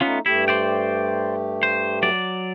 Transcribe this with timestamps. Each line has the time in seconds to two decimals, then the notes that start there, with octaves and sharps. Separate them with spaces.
0.01 A3 B3 C#4 D#4 F4
0.26 G2 A3 E4 G4
0.48 C5 D5 G5
1.63 C5
2.03 F#3 D5